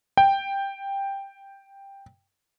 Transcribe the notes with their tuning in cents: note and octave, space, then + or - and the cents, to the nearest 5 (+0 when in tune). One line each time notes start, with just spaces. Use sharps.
G5 +5